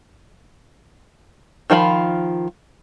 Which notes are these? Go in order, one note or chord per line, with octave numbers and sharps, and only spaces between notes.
D#3 F3 F4 B5